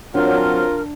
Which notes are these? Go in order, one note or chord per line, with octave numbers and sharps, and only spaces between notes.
F#3 C4 D4 F4 A#4